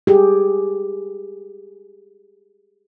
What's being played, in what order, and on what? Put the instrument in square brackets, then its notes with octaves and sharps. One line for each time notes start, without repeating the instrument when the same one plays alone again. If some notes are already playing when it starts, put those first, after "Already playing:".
[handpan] G4 G#4